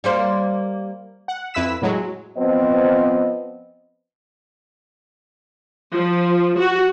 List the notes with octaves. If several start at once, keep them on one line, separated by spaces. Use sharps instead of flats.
G3 A#3 C5
F#5
F2 E4 B4 E6 B6 E7
A2 F#3 G#3
F3 B3 C4 D#5
F3
F#4